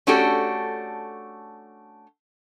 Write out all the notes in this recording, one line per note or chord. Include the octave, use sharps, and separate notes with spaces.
A3 C#4 D4 F#4 G4 A4